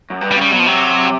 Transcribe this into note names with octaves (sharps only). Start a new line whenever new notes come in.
F#2
G2
G3
C#3
G3
B2 F#3
F3
C3 F#3